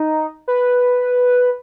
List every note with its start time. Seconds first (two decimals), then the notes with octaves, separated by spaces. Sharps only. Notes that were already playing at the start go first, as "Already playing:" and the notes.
Already playing: D#4
0.48 B4